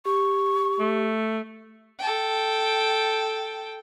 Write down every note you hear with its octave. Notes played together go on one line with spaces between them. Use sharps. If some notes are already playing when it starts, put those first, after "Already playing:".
G4 C#6
A3
A4 G5